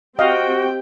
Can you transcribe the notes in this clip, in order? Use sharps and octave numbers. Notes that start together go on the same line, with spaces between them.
C4 F#4 G4 D#5 F5 G5